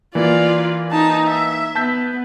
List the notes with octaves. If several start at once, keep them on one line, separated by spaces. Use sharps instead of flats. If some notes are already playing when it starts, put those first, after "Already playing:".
E3 A#3 F4 D5
D#4 A5
E5
B3 A5 G6 B6